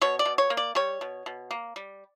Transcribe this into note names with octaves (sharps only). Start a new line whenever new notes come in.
B2 C#5
D5
B2
C#5
A#3
D5
G3 C#5
B2
B2
A#3
G3